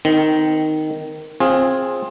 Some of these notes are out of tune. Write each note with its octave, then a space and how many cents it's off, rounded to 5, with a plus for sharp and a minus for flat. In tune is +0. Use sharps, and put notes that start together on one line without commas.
D#3 +0 C4 -30
C4 +25 F4 +10 G#4 +0